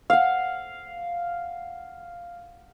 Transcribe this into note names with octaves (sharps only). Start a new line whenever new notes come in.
F5 F#5